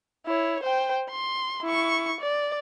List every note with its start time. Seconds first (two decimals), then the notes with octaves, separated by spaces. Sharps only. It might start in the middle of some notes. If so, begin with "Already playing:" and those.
0.26 E4 C#5
0.63 C5 G5
1.10 C6
1.63 E4 C#6
2.20 D5